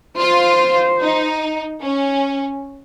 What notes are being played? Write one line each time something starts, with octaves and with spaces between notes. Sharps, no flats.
F4 C5
D#4
C#4